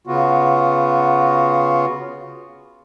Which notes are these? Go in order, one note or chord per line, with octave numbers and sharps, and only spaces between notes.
C#3 B3 F4 F#4